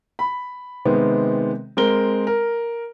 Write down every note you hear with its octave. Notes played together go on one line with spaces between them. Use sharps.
B5
C3 D#3 G#3 B3 C4
G#3 C4 A#4 G7
A#4